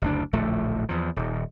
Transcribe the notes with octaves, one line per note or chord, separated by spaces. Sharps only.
F#1 D2 D4
D1 A#1 F3 A3
E2 F3
D#1